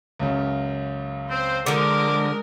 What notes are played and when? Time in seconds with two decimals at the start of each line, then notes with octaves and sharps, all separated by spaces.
0.20 C#2 F#2 C#3
1.31 C4 C5
1.66 D3 F3 G#3 A#4 D6